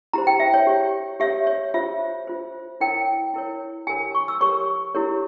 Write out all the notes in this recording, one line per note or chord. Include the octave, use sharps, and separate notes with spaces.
E4 G4 C5 A#5
G5
E5
C#5
G4 C#5
G4 C#5 E5
C#5
F4 C5 E5
F4 C5
E4 A#4 C#5 G5
E4 A#4 C#5
G4 A#4 C#5 G#5
C#6
E6
G4 A#4 C#5 C#6
E4 G4 A#4 C#5